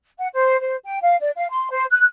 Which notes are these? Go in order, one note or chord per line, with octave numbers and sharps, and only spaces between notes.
F#5
C5
C5
G5
F5
D5
F5
C6
C5
F#6